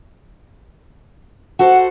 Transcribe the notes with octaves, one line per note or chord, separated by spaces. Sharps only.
F#4 A4 C5 F#5